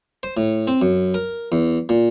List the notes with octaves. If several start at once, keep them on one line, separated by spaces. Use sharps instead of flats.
C5
A2
C4
F#2
A#4
E2
A#2